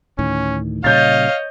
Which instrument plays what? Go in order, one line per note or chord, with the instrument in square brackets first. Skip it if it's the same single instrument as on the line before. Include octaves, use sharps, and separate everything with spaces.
[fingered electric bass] D2 A2 D#3 [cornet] C#4
[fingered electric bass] A#2 C#3 G3 [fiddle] C#5 D#5 [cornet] F5 [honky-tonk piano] G6 A6